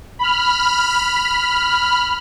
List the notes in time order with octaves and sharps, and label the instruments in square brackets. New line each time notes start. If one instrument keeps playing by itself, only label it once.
[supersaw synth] B5 F6